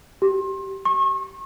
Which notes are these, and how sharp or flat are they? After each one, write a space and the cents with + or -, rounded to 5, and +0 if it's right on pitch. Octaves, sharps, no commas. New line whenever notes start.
G4 -20
C#6 -35